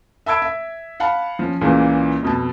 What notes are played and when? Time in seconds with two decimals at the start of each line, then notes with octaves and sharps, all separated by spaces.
0.26 E5 A5 B5 E6 G#6 D7
0.42 E5
1.00 F5 F#5 A5 B5
1.39 F3 C#4
1.61 C#2 A#2 C#3 E3
2.23 F2 B2 A5